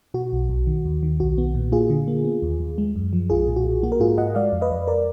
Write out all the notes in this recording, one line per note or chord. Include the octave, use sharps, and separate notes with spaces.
B2 F#4
B1
B1
D#3
D#2
D#3
B1 F#4
B3
A#2
A#3 F4 G#4
D3
A#3
B3
D#2
D#2
G#3
F#2
F3
B1 F4 G#4
A#2
F#4
B1
A#3 F#4
A#4
G#2 F4 G#4
G#2 D#5 F#5
G#3 D5 F5
F2
B4 D#5
F2
A#4 D5